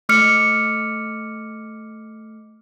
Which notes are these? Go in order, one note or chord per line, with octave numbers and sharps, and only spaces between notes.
A3 D6 F6 C#7